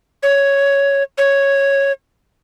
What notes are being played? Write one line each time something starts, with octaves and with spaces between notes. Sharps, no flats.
C#5
C#5